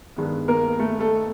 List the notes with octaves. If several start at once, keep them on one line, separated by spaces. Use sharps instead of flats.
G2 D#3 G#3 B3
A#3 A#4
A3 A4
A3 A4